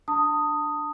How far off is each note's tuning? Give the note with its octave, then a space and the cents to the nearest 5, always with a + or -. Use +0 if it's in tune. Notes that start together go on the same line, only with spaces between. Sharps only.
D4 +0 A5 +30 D#6 +0